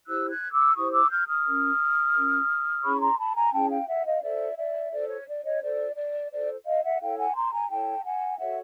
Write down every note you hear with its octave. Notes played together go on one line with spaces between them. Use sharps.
E4 G4 C5 E6 F#6
F#6 G#6
D6 E6
E4 G4 C5 C#6 D#6
D6 E6
F6 G6
D#6 F6
C#4 F4 A#4
C#4 F4 A#4
C#4 E4 G#4 C#5 B5 C#6
A#5 C6
A5 B5
G#5 A#5
C#4 E4 G#4 C#5 G5 A5
F5 G5
E5 F#5
D#5 F5
F4 A4 C5 D5 E5
D5 E5
F4 A4 C5 D5
C#5
D5
C#5 D#5
F4 A4 C5 D5
D5
F4 A4 C5 D5
D#5 F5
E5 F#5
E4 A4 C#5 F5 G5
F#5 G#5
A#5 C6
G#5 A#5
E4 A4 C#5 G5 A5
F#5 G#5
F#4 A4 C#5 E5 F#5